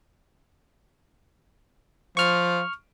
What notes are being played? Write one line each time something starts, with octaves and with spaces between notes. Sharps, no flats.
F3 C#6 F6